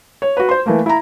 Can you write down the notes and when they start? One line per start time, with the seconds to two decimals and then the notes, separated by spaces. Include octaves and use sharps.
0.22 C#5
0.37 F#4 B4
0.49 C5 C6
0.66 E3 A3 A#3
0.86 E4 A#5